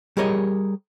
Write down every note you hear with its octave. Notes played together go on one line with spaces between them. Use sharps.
G3 G4 G#4 A#4 C#5 D#5